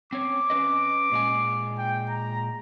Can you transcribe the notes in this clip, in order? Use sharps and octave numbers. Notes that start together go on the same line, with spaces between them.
C4 C#4 C#5 D6
C#4 B4 D#5
A#2 G#3 G#5
G5
A#5